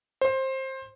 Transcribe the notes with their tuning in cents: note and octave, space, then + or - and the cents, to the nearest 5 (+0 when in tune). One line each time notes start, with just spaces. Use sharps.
C5 +20